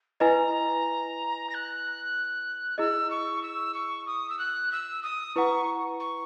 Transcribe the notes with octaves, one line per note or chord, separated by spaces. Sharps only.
E4 B4 D#5 G#5 A#5
A#6
F#6
E4 G#4 D#5 E6
C#6
E6
C#6
D#6
E6
F#6
E6
D#6
E4 B4 F#5 A#5 C#6
C#6